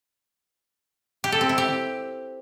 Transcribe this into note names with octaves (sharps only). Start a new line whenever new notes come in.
G4
A4
C4
E4
G4